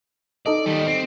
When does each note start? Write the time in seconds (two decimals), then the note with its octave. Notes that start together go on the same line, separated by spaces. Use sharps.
0.46 D#4 A4 D5 D#5
0.66 D#3 G3
0.87 C4